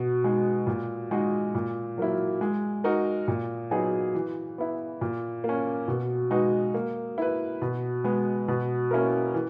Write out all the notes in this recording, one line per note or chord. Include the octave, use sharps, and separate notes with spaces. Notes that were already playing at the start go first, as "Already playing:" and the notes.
Already playing: B2
G#3 D#4
A#2
G#3 D#4 F#4
A#2
F#3 A#3 E4
G#3
D#4 F#4 A#4
A#2
F#3 B3 D#4 G#4
E3
B3 E4
A#2
A#3
C#4
B2
G#3 D#4 F#4 B4
A#3
E4 B4
B2
G#3 B3
B2
A#3 C#4 E4 A#4
E3